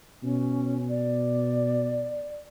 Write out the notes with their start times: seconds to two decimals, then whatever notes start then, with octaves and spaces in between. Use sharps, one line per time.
0.23 B2 C#4
0.89 D5